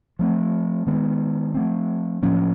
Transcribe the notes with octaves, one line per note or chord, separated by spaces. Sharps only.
F3 A3 C4
D#3 G#3 B3
F3 A3 C4
A2 F3 A#3 C#4